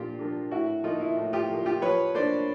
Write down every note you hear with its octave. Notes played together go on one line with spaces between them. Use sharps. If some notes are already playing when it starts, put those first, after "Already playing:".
Already playing: A#2 F3 A#3 D4 F4 G4
F3 A#3 D4
A2 E4 F#4
F3 A#3 D#4 F4
E4
A2
F4 G4
F3 A#3
F4 G4
F3 B4 C#5
A#3 D4 C5 D5